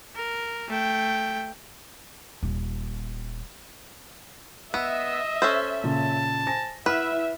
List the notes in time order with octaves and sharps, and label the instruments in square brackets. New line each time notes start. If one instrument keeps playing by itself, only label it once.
[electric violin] A#4
A3 G5
[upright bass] D#1
[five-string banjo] B3 [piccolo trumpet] D#5 [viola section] E5 [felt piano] E6
[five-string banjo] C#4 A4 C5
[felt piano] A#2 C#3 [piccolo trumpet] A5
[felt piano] C5 G#5 A#6
[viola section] E4 E5 [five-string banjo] B4 [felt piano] F#5 F6